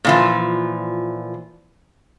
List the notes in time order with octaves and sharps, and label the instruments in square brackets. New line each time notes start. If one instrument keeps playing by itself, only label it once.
[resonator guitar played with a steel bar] A#2 E3 F3